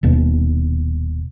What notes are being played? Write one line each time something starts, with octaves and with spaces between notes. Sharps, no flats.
D#1 D#2 B2